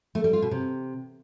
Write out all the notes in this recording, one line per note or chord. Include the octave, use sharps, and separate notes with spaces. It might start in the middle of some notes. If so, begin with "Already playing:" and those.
A3
G3
F4
B2
C3